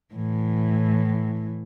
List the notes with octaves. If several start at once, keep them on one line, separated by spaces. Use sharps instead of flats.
A2 E3